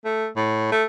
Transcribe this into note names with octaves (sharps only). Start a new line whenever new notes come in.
A3
A2
A3